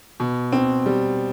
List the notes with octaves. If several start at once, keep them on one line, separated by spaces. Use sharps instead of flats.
B2
C4
G3